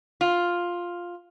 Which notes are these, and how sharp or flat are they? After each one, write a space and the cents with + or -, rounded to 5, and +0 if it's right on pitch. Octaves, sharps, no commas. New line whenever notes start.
F4 +5